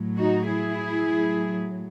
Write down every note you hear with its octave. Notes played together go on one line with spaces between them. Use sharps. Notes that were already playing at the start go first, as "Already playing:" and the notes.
Already playing: A2 F#3
D#4 F#4
E4 G#4
A2 F#3